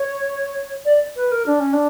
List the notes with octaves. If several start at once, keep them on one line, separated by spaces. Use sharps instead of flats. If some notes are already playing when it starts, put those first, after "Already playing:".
Already playing: C#5
D5
B4
A#4
D4
C#4
D4